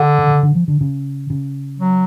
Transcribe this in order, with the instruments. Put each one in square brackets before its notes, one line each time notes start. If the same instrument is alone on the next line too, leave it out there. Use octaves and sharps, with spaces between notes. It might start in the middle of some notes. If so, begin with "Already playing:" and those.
Already playing: [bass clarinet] D3
[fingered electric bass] C#3
C#3
D3
F3
D3
C#3
C#3
[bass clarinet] F#3